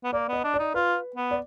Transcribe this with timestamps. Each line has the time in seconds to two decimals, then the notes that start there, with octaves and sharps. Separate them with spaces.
0.04 B3
0.13 A#3 D5
0.29 B3 D#5
0.44 D4
0.54 D5
0.59 D#4
0.74 F4 B4
1.16 B3
1.31 D5